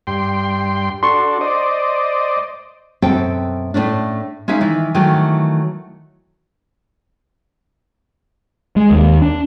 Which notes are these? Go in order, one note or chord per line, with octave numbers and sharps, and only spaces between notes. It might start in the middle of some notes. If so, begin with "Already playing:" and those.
G2 G5 C6
D4 F#4 A4 C6 C#6
C5 D5 D#5
F#2 B2 C4 A4 G5
A2 A3 C#4 D4
G#3 C#4 D#4 E5 F5
D#3 E3
D#3 E3 F#3 A3
G#3
D#2
D4